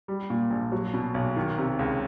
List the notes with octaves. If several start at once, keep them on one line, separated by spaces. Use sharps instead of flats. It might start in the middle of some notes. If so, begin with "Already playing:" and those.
G3
A#2
A#1
F#3
B2
B1
D#3
C3
C#2